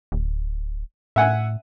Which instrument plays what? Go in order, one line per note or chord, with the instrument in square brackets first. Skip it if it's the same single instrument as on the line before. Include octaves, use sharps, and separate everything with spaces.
[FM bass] D1
[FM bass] A2 [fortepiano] E5 F#5 G#5